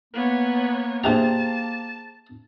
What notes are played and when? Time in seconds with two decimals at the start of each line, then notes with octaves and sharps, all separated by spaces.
0.14 A#3 B3 C#5
1.04 A#2 D4 G4 G#4 C5 A5 A#5